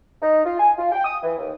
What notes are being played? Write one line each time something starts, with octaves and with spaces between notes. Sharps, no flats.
D#4
F4
G#5
F4
G5
D#6
E3
D#2